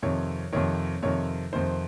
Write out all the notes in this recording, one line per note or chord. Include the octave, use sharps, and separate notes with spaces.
F2 C3 D#3 C#5
F2 C3 D#3 C#5
F2 C3 D#3 C#5
F2 C3 D#3 C5